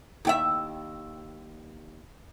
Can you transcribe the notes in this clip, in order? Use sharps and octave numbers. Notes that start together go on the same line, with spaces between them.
D#2 G4 E5